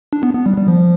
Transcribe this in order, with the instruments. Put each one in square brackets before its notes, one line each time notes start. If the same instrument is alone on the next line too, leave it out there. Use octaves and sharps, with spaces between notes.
[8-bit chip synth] D4
B3
B3
G3
G3
F3